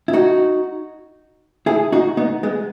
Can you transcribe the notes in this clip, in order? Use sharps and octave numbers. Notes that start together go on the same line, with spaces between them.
E4
D#4 F#4
E4 G#4
D#4 F#4
B3 D#4
G#3 B3